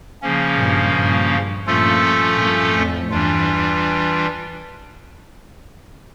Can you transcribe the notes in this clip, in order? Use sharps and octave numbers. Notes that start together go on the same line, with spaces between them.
C#3 F3 A#3 C#4
G2 A#2
G2 A#2
G2 A#2 F3 A3 C#4 F4 A4
G2 A#2
F2 A2
E2 G2 E3 G3 D4 F4